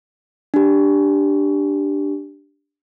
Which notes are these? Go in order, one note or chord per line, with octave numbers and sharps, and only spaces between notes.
D4 G4